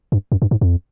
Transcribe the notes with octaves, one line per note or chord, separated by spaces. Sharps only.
G2
F#2
G2
G#2
F2